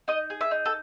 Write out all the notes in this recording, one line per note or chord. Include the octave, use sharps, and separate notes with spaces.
D#4 D#5
G#4
E5
D#4
A4